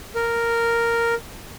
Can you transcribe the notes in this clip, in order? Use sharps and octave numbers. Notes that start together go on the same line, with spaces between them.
A#4